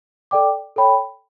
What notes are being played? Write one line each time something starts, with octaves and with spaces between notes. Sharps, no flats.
A4 D5 G5 D6
A4 C#5 G5 B5